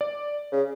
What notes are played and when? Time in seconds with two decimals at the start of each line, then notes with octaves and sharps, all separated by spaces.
0.01 D5
0.52 C#3